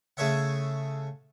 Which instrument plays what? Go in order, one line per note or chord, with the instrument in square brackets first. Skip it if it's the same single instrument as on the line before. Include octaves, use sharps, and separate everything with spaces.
[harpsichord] C#3 A3 G#4 C#5 E5 F#5